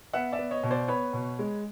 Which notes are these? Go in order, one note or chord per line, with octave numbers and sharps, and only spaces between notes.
B3 E5 F#5
D5 E5
B3
C#5 D#5
B2
C5 D5
B3 B4 C#5
B2
G#3